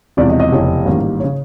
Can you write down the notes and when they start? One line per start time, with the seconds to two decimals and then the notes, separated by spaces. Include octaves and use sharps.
0.17 E1 E2 C3 F3 D5
0.29 D#5
0.40 D#5
0.52 F1 E2 C#3 E3
0.85 A1 G#2 D#3 G3 A#3
1.20 C#3 C#5